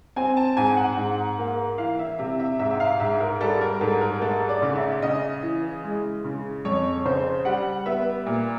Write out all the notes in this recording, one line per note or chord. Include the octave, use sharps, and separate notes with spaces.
C4 G#5
A5
G#2 G#5
F#5
G#2
A#3
E3 F5
E5
C3 E5
E5
G#2 E5
E5
F5
G#2 E5
A#4
G3 A4
A#4
G#2 A4
A#4
A3 A4
D5
C#3
E5
C#3 D#5
E3
G#3
C#3
F2 C#5
C#3 C5
G3 F#5
B3 E5
A#2